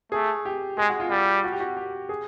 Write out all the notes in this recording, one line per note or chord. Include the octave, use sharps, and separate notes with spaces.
A3 G#4
G4
G#3 G#4
F#4
F4
G3
F#4
G4
F#4
G4
G#4